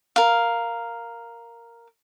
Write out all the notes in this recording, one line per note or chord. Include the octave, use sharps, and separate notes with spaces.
A#4 F5